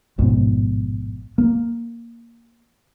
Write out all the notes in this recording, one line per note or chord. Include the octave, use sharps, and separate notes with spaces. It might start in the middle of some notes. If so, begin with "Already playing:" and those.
A1 F2 G#2 B2
A#3